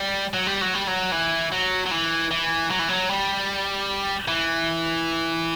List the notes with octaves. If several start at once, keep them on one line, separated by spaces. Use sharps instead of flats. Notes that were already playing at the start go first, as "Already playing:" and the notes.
Already playing: G3
F#3
G3
F#3
G3
F#3
E3
F#3
F#3
E3
E3
F#3
E3
F#3
G3
E3